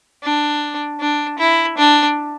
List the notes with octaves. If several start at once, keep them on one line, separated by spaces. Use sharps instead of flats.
D4
D4
E4
D4